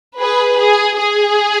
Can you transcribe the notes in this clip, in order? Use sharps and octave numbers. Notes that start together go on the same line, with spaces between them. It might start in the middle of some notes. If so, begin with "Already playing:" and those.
G#4 B4
G#4
G#4